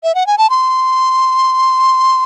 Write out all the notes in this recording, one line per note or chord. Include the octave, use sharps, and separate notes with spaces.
E5
F#5
G#5
A5
C6